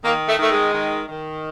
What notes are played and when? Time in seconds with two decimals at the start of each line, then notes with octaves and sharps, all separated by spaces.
0.04 D#3 A#3
0.28 A3
0.39 D#3 A3
0.51 G#3
0.74 D#3
1.09 D#3